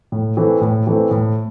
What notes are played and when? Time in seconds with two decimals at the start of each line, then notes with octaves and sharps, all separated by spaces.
0.12 A2
0.37 E3 A3 C4
0.61 A2
0.87 E3 A3 C4
1.11 A2